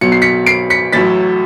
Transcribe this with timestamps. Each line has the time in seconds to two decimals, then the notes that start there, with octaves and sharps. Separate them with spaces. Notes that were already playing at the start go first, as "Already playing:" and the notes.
0.01 B1 B2 F#3 C#7
0.12 C7
0.22 B6 C#7
0.46 C7 D7
0.70 B6 C#7
0.92 A1 A2 F#3 A6 B6